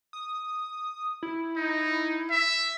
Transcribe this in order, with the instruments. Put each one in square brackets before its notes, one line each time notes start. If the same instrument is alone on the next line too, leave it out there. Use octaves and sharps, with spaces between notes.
[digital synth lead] D#6
E4
[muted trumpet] D#4
E5